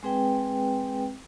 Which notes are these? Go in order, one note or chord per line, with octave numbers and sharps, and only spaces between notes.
G#3 C4 G#4 B4 G5